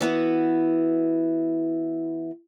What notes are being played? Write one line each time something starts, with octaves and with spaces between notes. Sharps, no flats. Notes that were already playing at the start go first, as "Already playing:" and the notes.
E3 B3 E4 F#4